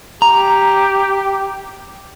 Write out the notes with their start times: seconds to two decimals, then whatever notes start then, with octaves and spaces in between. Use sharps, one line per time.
0.22 G4 A#5